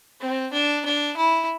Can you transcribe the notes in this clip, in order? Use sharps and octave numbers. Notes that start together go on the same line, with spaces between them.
C4
D4
D4
E4